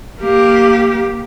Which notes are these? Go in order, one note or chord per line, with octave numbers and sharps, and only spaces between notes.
A#3 G4